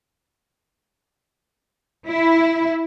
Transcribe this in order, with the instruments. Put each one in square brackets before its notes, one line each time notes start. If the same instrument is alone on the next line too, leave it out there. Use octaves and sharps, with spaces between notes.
[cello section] E4